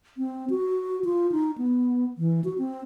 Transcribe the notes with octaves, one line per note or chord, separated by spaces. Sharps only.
C4
F#4
F4
D#4
B3
E3
F#4
C4